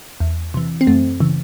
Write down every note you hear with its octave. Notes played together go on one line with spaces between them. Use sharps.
E2
C3 E3
C4
F#2 A3
C#3 E3